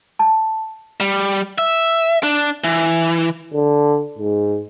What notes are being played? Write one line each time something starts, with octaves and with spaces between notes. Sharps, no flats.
A5
G3
E5
D4
E3
D3
G#2